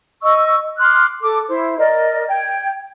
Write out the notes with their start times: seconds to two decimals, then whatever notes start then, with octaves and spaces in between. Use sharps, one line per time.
0.22 D#5 C#6 E6
0.79 C6 D6 F6 F#6
1.21 A4 D6
1.48 E4 C5
1.79 A#4 D5 D#5
2.29 G5 G#6